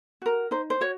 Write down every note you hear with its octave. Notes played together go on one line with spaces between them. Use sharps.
F#4 A#4
D#4 C5
C5
F#4 C#5